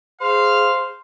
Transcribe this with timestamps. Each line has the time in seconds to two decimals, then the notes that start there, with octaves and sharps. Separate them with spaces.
0.21 G#4 C5 F5